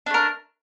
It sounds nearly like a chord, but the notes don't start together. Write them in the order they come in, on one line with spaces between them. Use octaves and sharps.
D4 A3 A#4